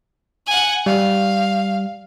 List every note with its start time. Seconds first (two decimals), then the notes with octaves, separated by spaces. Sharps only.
0.46 F#5 G#5
0.86 G3 F5